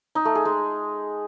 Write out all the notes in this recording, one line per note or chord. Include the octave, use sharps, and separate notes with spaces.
D#4
A3
G#4
G#3